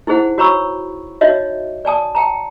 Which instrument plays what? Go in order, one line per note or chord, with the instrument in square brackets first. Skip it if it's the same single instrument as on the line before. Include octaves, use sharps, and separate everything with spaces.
[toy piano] D#4 E4 G#4 C5 F#5
F#4 C#5 A#5 B5 C#6 E6
D#4 F#4 C#5 D#5 E5
D5 G#5 A5 D#6
G5 A5 A#5